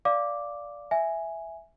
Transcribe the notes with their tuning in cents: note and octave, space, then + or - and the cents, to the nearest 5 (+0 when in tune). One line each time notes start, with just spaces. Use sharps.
D5 -10 F5 +0 D6 +0
E5 +0 G#5 +0